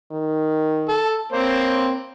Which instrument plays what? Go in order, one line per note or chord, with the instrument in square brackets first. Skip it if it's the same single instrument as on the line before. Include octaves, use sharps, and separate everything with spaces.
[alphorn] D#3
[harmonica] A4
[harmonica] A#3 C4 C5 [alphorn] C#5